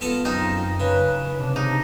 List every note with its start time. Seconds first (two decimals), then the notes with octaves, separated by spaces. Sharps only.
0.01 B3 F4 A4 A#5
0.25 F#2 C4 D#4
0.80 C#3 B4
1.27 B4
1.39 C3 D4
1.56 D#4